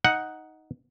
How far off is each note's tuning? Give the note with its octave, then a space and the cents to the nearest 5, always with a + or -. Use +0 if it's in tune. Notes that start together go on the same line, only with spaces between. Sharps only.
D#4 +5 F#5 +0